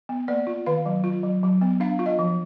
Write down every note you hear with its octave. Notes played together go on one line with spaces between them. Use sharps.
B3
A#3 D5
F4
D#3 F5
F#3
F4
F#3
F#3
B3
D4 F5
F4
D#5
F3